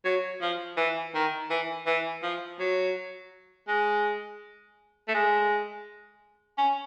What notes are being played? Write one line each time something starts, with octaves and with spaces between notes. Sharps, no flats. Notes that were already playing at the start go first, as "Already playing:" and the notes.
F#3
F3
E3
D#3
E3
E3
F3
F#3
G#3
A3
G#3
C#4